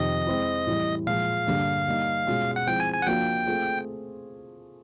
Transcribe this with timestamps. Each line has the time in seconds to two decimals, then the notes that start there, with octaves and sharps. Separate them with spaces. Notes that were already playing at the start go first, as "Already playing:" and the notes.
Already playing: F2 C3 D#3 D#5
0.27 G#3 C4 E4
0.67 A2 E3 G3
1.07 A#2 F3 G#3 F5
1.47 G2 D3 G3 A#3 D4
1.87 G3 A#3 D#4
2.27 B2 G#3 C#4 F4
2.56 F#5
2.67 F3 G#3 C4 E4 G5
2.80 G#5
2.94 G#5
3.02 F#5
3.06 F3 A#3 D4 F#4 A#4 G5
3.47 A3 C4 F4 G#4